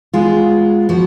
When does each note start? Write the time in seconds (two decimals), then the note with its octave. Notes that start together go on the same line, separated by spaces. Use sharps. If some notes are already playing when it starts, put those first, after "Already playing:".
0.13 G#3 B3 F4 G#4
0.89 F3 B3 F#4